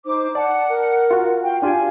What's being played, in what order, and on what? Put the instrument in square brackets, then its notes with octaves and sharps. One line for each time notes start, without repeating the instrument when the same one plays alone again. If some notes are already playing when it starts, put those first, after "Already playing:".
[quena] D#4 [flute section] C5 D6
[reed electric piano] D5 [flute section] F#5 [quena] A5
[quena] A#4
[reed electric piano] F4 F#4
[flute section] F5 G5
[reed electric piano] D4 F4 G4 [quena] F5 [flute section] G#5